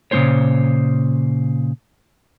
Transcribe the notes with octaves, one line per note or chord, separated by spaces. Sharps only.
A#2 C#3 C4 C#4 C5 C#5